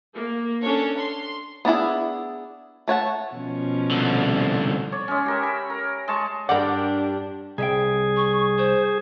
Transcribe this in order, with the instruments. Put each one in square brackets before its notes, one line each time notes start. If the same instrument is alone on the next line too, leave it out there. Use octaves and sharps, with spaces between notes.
[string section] A#3
C#4 D4 A4 C#5
C6
[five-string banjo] B3 D4 E4 G#4
A3 C#5 F#5 A5
[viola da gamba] B2 F3 C#4
[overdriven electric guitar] C2 D3
[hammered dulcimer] C#5 D5
G#3 C#4
G4 A#4 E5
B5
A#4
G#3 A5 C#6
[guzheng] G2 G5 [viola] D4 G4 [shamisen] A#4 F#5 [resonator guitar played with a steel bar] D5
[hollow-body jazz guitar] C2 E5 G5 [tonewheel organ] G#4
[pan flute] C#6
C5